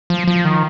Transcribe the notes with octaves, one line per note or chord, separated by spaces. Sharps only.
F3
F3
D#3